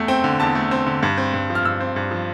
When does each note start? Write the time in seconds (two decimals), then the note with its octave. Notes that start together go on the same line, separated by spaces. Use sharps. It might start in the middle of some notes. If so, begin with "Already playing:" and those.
Already playing: E2 A3
0.08 C4 G5
0.24 D3
0.40 E2 A5
0.55 A3
0.71 C4
0.86 D3
1.03 G2
1.17 C4
1.34 G2
1.50 F3
1.55 F6
1.64 G2 E6
1.80 C4
1.96 G2
2.11 F3